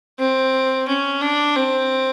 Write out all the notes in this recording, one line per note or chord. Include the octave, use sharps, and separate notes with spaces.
C4
C#4
D4
C4